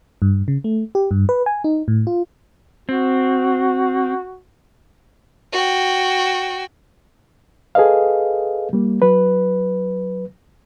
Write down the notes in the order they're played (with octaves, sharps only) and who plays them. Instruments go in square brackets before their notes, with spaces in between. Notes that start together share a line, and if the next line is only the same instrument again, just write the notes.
[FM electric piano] G2
C#3
A3
G4
G2
B4
G#5
D#4
A2
F4
[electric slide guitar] C4 [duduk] F#4
[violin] F#4 G5
[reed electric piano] G#4 A4 B4 D#5 F5
G3 A#3
F#3 B4